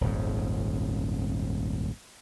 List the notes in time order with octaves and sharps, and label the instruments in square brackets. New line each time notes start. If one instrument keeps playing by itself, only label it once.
[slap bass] D#1 G#1 F2 G#2